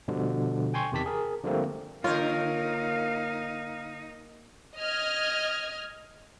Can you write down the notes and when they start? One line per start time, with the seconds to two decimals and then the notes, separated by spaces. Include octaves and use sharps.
0.08 B2 D3 F3 G3
0.74 G5 G#5 C6 C#6 G#6
0.91 E2 C3 D#3 G4 A5 B6
1.06 G#4 A#4
1.44 D3 F3 G3 A3 A#3 C4
2.04 D3 A#3 D#4 F4 A#4 C#5 F5
4.77 D#5 F6 G#6